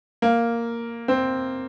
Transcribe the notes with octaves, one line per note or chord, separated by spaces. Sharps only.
A#3
C4